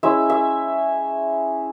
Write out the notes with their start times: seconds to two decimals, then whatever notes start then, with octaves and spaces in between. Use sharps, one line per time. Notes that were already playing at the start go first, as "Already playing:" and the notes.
0.03 G#3 C#4 E4 E5
0.30 E5